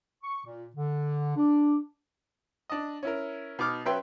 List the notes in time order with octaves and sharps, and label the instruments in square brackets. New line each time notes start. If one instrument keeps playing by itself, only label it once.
[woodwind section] C#6
A#2
D3
D4
[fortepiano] D4 D#5
C#4 E4 A#4
B2 D#4 D6 F6
F#3 C#4 B4 E5 G5 C6